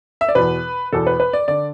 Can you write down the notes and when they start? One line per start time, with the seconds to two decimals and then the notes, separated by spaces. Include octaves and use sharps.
0.21 E5
0.29 D5
0.35 E2 B2 B4
0.93 E2 B2 A4
1.07 B4
1.20 B4
1.33 D5
1.48 D3 D5